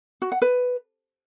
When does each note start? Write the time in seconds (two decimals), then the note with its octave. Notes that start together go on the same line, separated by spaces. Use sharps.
0.22 F#4
0.32 F#5
0.42 B4